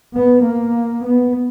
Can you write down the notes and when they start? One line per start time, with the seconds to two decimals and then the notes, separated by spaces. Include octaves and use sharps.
0.15 B3
0.45 A#3
1.06 B3